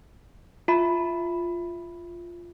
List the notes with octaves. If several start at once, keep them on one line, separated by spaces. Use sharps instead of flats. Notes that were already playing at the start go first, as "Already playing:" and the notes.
F4 E5 B5